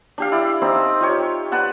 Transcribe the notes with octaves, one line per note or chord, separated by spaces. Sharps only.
D4 G4 F5
E4 D5
C4 D#4 D5 F5
F4 G4 C#5
B4 D5 F#5 A5